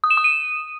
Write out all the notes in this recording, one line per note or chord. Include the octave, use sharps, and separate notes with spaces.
D#6
E7
D#6
D#7